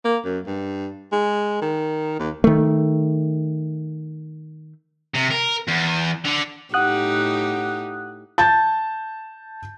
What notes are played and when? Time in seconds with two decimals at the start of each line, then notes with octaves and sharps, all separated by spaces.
0.05 A#3
0.25 F#2
0.47 G2
1.12 G#3
1.62 D#3
2.19 D#2
2.44 D#3 A3
5.15 C3
5.31 A#4
5.68 E2
6.25 D3
6.74 A2 D#4 G4 F#5 D#6 F#6
8.38 A5 G6 A6